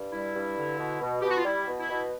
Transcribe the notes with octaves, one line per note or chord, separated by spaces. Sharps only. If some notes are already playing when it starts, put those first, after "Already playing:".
Already playing: G2
G3 E4
G2
D3
B2
B2
B2 G4
F#4
F4
G3 E4
B2
E4
B2